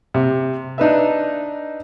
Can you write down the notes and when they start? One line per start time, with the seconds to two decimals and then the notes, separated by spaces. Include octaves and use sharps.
0.14 C3
0.78 D4 D#4 B4 E5